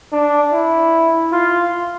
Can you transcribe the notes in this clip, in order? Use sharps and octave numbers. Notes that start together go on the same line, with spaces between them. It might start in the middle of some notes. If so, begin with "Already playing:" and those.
D4
E4
F4